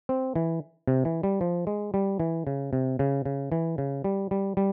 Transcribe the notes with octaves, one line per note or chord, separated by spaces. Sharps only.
C4
E3
C3
E3
G3
F3
G#3
G3
E3
C#3
C3
C#3
C#3
E3
C#3
G3
G3
G3